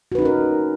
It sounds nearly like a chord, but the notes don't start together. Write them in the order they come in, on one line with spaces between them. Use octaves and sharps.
F#4 B4 D#4 C#4 A#4